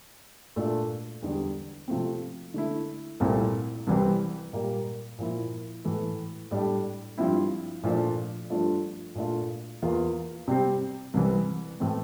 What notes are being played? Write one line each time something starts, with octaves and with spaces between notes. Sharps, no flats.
A#2 A3 D4 F4
E2 D3 G3
C3 F3 A3 C4
D3 A3 E4
C2 A#2 A3 C4 E4
C2 C3 E3 G3 C4
A#2 G3 A#3
A#2 F3 A#3 E4
A2 E3 A3
A2 G3 D4
G2 F3 C4 E4
A#2 F3 A3 D4
G2 F3 A3 D4 F4
A#2 A3 D4 F4
E2 E3 A#3 F4
C3 G3 C4
C2 C3 E3
A2 E3 A3 C4